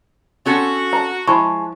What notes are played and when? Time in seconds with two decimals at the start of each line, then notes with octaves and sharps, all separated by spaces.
0.46 C4 C#4 F#4 A4
0.93 A5 A#5
1.27 F3 G#3 E4 A5 C#6